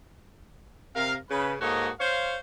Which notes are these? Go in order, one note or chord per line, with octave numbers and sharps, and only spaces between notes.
C3 A#4 F5
C#3 B4
G#2 A#3 F#4 A4 C#5 D#5
C5 C#5 F5